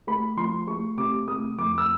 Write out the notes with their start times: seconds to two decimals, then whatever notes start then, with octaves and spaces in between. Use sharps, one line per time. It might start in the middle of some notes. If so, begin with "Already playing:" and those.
0.07 A3 B5
0.37 F3 C6
0.67 A3 C#6
0.97 C3 D6
1.28 A3 D#6
1.58 F2 D6
1.78 E6